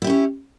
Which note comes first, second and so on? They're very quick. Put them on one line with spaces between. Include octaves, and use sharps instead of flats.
E4 G4 C#4 C#5